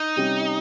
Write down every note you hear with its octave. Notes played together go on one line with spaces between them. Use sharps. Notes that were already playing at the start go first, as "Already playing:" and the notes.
Already playing: D#4
C3 G3 C#4 G4